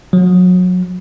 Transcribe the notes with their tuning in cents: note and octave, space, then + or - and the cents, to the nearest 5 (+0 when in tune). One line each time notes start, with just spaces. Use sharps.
F#3 -30